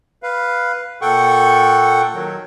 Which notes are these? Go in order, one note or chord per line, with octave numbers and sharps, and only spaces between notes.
B4 F5
A#2 A4 F#5 G5 C#6
D#3 F#3